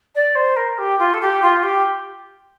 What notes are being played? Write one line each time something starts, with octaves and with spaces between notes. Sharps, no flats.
D5
C5
A#4
G4
F4
A4
G4
F4
G4